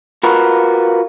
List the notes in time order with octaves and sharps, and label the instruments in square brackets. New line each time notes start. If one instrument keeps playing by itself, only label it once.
[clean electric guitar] F4 F#4 A#4 B4